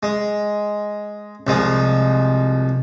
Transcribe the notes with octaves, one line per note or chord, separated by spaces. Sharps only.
G#3
C2 F3 G#3